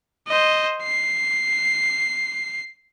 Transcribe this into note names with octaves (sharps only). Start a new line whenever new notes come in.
C5 D#5
C7